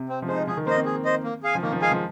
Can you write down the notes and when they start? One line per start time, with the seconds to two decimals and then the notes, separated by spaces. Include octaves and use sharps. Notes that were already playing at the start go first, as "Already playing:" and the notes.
Already playing: C3
0.09 C4
0.22 F3
0.28 G#3 D#4 C5
0.47 F3 G#4
0.57 D#3
0.67 A#3 C5
0.70 D#5
0.76 C4
0.86 G#4
1.05 C5 D#5
1.24 A#3
1.43 G#4 F5 G#5
1.55 F3
1.62 D#3 A#3
1.72 F3
1.82 G#3 G#4 F5 G#5
1.92 F3